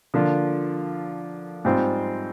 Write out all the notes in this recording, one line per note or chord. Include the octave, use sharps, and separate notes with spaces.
D3 F3 A#3 D4 F4
G#2 G3 C4 F4 C5